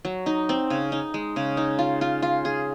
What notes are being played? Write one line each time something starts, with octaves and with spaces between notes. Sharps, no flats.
F#3
D#4
C4
C#3
D#4
G#3
C#3
D#4
F4
F4
F4
G#4